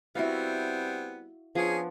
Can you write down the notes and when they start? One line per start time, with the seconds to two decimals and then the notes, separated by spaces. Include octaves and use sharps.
0.15 G3 B3 C4 E4 F#4 F5
1.55 F3 B3 C#4 D4 G#4